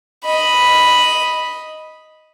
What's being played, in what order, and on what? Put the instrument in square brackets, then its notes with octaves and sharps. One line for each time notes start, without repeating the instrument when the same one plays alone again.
[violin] D#5 B5